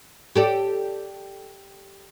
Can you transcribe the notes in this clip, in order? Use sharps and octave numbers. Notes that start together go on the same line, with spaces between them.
G4 A4 D5